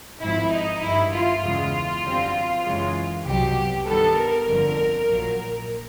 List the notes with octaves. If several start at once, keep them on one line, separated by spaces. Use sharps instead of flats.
G#1 G#2 F3 E4
D#4
G#1 G2 D#3 E4
F4
E2 C#3 E3 G#3 F4
F#2 D3 G3 C4
F#2 C#3 E3 G#3
C2 B2 F#3 G4
G2 D#3 G3 B3 A4
A#4
G1 F2 D3
A#1 A#2 F#3